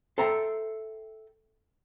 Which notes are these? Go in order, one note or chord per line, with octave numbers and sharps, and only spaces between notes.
A4 C5 E5 G5 A#5